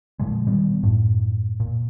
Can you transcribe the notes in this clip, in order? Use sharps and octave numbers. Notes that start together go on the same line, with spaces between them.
A#2 D3 F3 G#3
B2 D#3 G3 B3
F#2 A2
A#2